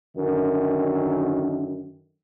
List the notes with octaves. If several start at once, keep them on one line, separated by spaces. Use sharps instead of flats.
F#2 D3 D#3